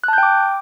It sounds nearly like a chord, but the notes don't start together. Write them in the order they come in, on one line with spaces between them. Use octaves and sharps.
F#6 A5 G6 G5 D6